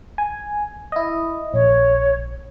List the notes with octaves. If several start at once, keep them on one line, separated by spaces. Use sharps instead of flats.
G#5
E4 D#5
A#1 C#5